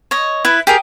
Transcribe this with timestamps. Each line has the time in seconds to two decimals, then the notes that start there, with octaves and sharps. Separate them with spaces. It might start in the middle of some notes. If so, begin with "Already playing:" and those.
0.11 C#5 D#5
0.45 E4 B4
0.67 G4 G#4 A#4